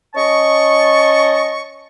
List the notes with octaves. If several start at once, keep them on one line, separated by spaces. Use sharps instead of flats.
C#4 D#5 A5 C#6